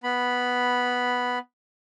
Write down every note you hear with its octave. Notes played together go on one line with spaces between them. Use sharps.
B3 B5